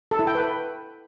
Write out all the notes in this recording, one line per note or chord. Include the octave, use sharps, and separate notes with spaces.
A4
E4
G5
B4